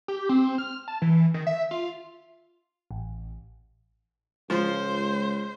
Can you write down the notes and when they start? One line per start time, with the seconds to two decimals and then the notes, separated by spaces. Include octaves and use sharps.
0.08 G4
0.29 C4
0.58 F6
0.88 A5
1.02 E3
1.34 D#3
1.47 E5
1.71 F4
2.91 A1
4.50 C#2 F3 G#3 C5